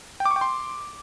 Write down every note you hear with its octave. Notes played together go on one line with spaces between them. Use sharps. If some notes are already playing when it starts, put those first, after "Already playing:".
G5
D6
C#6
G5
C6